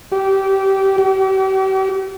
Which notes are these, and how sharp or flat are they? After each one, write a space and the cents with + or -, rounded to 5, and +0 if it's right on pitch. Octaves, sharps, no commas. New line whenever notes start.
G4 -20
G4 -40